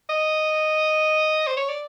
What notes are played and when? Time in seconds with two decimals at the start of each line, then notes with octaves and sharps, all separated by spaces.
0.09 D#5
1.47 C5
1.57 C#5
1.69 D5